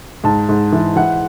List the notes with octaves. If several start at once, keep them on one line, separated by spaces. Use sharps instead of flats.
G#2 A5
G#2
E3
E3 F#5